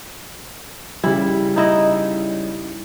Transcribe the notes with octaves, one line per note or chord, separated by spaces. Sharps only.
C#3 G3 E4
D#4 E4 D#5